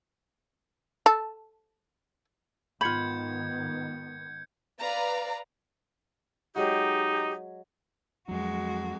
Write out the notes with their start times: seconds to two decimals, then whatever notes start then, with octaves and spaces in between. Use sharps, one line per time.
1.06 A4
2.81 G#2 D#3 B3 F4 B5 G6 G#6 C#7
4.80 B4 D5 F5 A#5
6.56 F#3 G#3 D#4 F#4 G4
8.29 F2 F#3 G#3 F#4